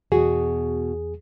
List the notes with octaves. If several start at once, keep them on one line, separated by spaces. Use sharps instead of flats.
E2 B2 F#4 G#4